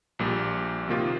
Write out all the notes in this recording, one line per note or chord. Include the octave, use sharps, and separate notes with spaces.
A#1 A#2 G3
C3 D#3 A#3 F4